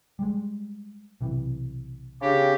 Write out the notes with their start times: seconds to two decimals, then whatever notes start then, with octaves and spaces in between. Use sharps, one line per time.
0.19 G3 G#3
1.21 B1 C3 E3
2.21 C#3 C4 D4 G4